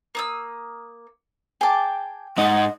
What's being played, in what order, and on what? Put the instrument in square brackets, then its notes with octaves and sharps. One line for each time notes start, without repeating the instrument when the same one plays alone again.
[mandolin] A#3 D#6 E6
[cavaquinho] G#4 A5 [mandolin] G5 D6
[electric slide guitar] G#2 D#4 [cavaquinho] D#5 [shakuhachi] F#5